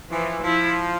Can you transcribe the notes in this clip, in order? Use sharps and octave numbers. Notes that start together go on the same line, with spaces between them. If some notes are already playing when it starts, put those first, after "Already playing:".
E3 F3
F3 E4